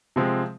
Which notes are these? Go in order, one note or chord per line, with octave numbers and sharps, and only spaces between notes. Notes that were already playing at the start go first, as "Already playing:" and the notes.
C3 F3 G#3 C4